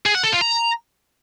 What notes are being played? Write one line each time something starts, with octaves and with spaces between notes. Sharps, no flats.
G#4
F#5
A4
F4
A#5